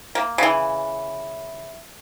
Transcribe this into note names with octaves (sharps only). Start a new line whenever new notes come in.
A#3
C#3 E3